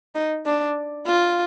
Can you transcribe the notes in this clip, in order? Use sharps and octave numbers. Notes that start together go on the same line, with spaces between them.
D#4
D4
F4